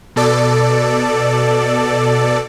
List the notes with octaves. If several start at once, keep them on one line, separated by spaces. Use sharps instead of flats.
B2 A4 D5